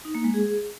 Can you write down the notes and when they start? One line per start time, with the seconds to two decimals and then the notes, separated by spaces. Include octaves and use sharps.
0.05 D#4
0.15 A#3
0.24 G#3
0.34 G#4